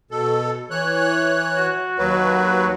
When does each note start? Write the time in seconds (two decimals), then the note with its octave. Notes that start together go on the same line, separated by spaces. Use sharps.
0.11 B2 A4
0.71 E3 C#5 F#6
1.56 F#4
1.98 D#2 F#3 F#4 B4